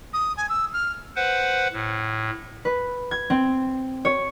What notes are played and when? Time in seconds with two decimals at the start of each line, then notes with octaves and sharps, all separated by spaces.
0.13 D#6
0.37 G#5
0.49 E6
0.73 F6
1.16 B4 C5 F#5
1.73 A2
2.65 B4
3.11 G#6
3.30 C4
4.05 C#5